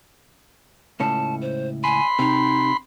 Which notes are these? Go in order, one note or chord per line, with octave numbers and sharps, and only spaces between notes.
C#2 A2 C#4 A5
C5
G#5 B5 C6
C3 D#4